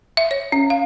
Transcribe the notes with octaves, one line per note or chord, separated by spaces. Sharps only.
E5
C#5
C#4
F5